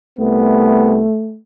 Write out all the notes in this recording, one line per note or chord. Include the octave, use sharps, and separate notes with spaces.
C2 A3 B3